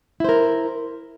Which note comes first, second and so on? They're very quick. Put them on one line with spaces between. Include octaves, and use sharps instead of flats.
E4 C5 A#4